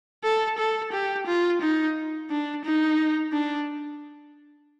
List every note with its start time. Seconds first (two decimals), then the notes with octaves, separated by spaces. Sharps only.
0.24 A4
0.58 A4
0.92 G4
1.26 F4
1.61 D#4
2.30 D4
2.65 D#4
3.33 D4